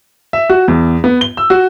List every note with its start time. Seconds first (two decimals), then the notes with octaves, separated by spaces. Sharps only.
0.33 E5
0.50 F#4
0.68 E2
1.04 B3
1.21 G7
1.37 E6
1.50 F#4